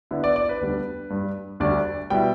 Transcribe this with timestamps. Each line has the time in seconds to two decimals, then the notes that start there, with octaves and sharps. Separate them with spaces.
0.11 D3 B3 E4
0.24 D5
0.36 D5
0.49 B4
0.61 D2 D3 G3 B3 D4
1.10 G2 G3 D4
1.60 D2 D3 G3 D4 D5
2.10 B2 G3 E4 G5